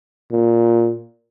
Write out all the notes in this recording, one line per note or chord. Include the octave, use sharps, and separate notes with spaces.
A#2